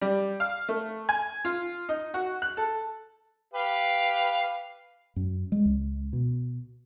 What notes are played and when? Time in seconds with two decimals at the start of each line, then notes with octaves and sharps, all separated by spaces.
0.02 G3
0.40 F5
0.69 A3
1.09 G#5
1.45 F4
1.89 D#4
2.14 F#4
2.42 F#6
2.57 A4
3.54 G4 B4 F5
5.16 F#2
5.52 G#3
5.65 C#2
6.13 B2